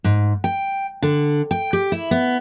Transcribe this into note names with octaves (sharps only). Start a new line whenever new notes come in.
G#2
G5
D3
G5
G4
E4
B3